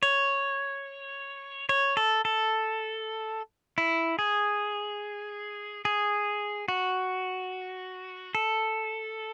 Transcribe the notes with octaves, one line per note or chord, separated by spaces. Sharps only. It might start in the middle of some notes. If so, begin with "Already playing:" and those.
C#5
C#5
A4
A4
E4
G#4
G#4
F#4
A4